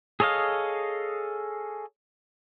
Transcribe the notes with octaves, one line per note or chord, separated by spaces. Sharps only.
G#4 A4 C#5 D#5 F5